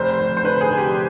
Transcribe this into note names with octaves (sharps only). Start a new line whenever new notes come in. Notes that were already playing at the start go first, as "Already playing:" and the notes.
Already playing: F1 C5
F1
C5
D3 B4
G#4
F1
G4